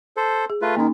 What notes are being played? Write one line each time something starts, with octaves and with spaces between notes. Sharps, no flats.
A4 C5
G#4
A3 F4 B4
D#3 A#3 C#4 D#4